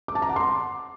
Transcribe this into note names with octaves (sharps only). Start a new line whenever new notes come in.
D6
A5
A#5
F#5
C6